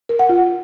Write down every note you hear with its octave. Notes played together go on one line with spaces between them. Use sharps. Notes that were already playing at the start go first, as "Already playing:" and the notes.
A#4
F#5
F4